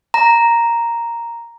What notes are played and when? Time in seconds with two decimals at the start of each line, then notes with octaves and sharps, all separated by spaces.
0.14 A#5